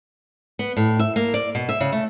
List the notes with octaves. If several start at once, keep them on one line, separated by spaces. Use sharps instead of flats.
B3
A2
E5
A#3
D5
B2
E5
C#3
A3